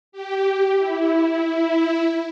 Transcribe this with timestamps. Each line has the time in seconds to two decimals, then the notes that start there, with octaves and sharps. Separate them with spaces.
0.12 G4
0.78 E4